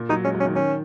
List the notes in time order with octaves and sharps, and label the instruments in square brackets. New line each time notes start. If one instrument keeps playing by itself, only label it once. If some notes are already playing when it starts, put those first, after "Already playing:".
Already playing: [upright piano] A#2
[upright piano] F#3 [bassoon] D#4
[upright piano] G#3 [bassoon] C#4
[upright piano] F#3
[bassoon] C#4
[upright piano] D#3
[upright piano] D#3 [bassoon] C#4